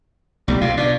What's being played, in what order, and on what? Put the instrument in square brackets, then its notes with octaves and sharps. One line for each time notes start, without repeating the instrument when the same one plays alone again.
[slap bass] B1 A3 [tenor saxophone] G3
[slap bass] C3 [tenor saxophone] F4
[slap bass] B2 [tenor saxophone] D4